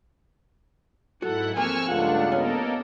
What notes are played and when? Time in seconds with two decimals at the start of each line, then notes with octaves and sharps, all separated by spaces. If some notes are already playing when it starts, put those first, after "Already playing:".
1.22 G#2 F#3 E4 F#4 A4 F#5
1.56 F3 G#3 A#3 C4 G#5 C#6 E6 F6
1.88 C#2 G2 A3 D4 F4 A4 F#5
2.32 A#3 B3 C#4 A4 A#4 D#5